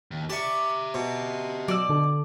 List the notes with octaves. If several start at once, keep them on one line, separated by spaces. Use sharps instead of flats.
D#2
G4 D5 E5 A5 C#6
B2
F#3 D5 E6
D3 A4